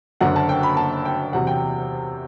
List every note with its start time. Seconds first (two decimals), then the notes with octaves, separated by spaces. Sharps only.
0.21 F#1 F#2 D3 F#5
0.36 A5
0.49 G5
0.63 B5
0.77 A5
1.05 G5
1.33 E2 C3 F#3 F#5
1.47 G5